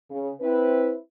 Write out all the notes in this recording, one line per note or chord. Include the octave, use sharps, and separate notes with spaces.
C#3
C4 E4 B4